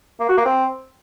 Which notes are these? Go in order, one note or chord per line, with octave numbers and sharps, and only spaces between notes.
A#3
F#4
A#3
C4